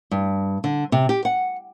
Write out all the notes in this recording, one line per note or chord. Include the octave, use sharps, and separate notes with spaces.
G2
D3
C3
G4
F#5